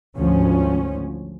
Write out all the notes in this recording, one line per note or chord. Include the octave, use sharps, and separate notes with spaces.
G#1 D2 F3 C#4